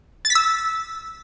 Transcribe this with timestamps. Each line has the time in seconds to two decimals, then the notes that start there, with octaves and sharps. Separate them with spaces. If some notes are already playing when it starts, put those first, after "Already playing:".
0.25 A6
0.30 B6
0.35 E6